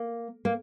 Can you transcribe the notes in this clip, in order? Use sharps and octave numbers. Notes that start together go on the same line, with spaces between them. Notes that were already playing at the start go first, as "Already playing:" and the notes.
Already playing: A#3
A#3